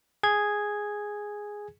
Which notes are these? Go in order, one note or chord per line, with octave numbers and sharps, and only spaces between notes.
G#4 G#6